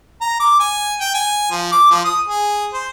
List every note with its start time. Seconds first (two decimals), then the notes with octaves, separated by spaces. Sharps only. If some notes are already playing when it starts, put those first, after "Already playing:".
0.21 A#5
0.40 D6
0.60 G#5
1.01 G5
1.15 G#5
1.51 F3
1.72 D6
1.91 F3
2.05 D#6
2.28 G#4
2.73 C5